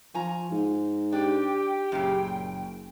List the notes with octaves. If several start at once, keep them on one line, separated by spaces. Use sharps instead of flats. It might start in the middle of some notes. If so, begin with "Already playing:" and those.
F3 G#5 A#5
G#2
D4 G4 G5
F#1 F#2 A#2 C#3